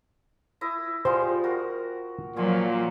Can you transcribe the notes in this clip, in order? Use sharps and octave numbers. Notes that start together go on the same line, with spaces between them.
E4 D#5
F3 G3 G#3 C5
F#4 A#4
A#2 F3 F#3 F4 G#5